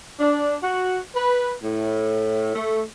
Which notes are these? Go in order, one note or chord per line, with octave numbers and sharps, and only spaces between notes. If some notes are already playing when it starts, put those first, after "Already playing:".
D4
F#4
B4
A2
A3